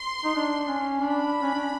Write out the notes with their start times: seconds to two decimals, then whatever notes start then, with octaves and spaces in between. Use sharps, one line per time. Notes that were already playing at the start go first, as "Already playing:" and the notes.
Already playing: C6
0.24 D#4
0.36 D4
0.68 C#4
1.01 D4 B5
1.42 C#4
1.54 D4